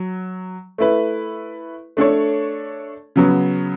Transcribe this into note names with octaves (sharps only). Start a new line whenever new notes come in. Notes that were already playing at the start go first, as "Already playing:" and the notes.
Already playing: F#3
A3 E4 B4
A3 D4 A4 C#5
C#3 F#3 B3